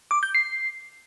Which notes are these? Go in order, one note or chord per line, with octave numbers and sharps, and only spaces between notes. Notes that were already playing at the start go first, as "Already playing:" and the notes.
D6
G6
C7